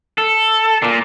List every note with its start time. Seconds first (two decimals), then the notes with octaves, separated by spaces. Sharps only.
0.18 A4
0.82 A#2